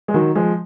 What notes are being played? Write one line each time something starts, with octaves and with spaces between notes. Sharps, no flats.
G#3
D#3 F#3
F3 G#3